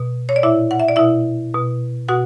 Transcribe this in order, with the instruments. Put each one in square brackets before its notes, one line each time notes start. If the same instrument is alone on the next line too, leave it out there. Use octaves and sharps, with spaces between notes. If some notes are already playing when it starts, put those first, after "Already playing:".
Already playing: [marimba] B2
C#5
D5
A#2 E4 E5
F#5
E5
D5
B2 E4 E5
B2
B2 F#4 F#5